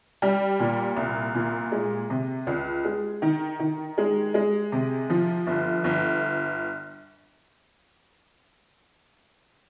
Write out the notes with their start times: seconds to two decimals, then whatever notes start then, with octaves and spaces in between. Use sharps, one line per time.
0.22 G3
0.60 A#2
0.96 C2
1.35 A#2
1.72 G#3
2.10 C3
2.47 C#2
2.85 G#3
3.22 D#3
3.59 D#3
3.98 G#3
4.34 G#3
4.72 C3
5.10 F3
5.47 G1
5.84 G1